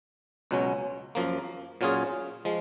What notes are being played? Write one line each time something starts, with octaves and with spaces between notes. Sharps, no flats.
C#2 B2 F#3 C#4
F#2 F3 A#3
A#2 F#3 C#4 F4 G#4
F3 G#3